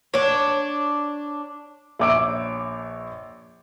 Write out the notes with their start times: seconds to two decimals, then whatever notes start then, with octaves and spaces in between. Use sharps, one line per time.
0.14 D4 C#5
1.99 A#1 C#5 E5 D6 E6 D7